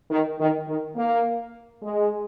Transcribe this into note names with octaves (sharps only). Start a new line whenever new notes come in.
D#3
D#3
D#3
A#3
G#3